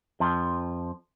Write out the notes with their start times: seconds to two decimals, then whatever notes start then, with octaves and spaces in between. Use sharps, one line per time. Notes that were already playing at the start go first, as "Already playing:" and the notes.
0.20 F2 F3